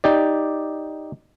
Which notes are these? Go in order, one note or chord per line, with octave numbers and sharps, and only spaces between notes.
D#4 G4 D5